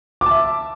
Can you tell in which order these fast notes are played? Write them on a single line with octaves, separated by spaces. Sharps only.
D6 A5 E5